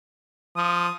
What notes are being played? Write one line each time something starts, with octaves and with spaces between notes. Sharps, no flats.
F3 D#6